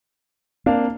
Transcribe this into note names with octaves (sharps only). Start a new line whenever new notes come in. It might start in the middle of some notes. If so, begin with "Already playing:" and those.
A#3 C4 D4 F5